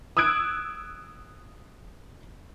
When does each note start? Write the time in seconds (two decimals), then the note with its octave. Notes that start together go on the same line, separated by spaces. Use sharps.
0.17 D#6 E6 F#6 G#6 D7